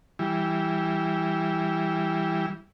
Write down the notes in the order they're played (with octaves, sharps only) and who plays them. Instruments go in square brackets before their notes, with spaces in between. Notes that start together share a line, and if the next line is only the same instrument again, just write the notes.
[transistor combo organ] E3 G3